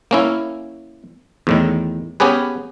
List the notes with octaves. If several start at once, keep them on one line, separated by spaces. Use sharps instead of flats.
A#3 C#4 E4
E2 A2 D#3
B3 C#4 G4 G#4 B4